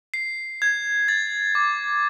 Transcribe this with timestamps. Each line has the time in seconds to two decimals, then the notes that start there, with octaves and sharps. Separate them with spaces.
0.14 C7
0.62 G#6
1.08 A6
1.55 D6